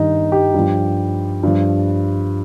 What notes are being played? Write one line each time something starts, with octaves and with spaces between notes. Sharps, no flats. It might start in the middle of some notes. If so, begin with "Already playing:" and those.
Already playing: G2 D#3 G3 D#4
G4
G2 F3
G2 F3